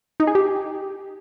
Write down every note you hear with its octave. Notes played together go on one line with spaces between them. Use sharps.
D#4
G#4
G4